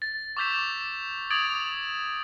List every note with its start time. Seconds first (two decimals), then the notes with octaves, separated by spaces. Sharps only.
0.02 A6
0.37 C#6 D6 E6 G6 B6 E7
1.30 D6 D#6 G#6 A6 D7 F7